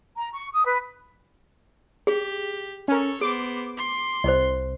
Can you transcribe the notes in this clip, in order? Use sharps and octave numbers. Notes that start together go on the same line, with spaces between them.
A#5
C#6
D#6
B4
G4 G#4
C#4 A4 A#4 C#5
B3 G#4 C5 D6
C6
C2 C5 D#5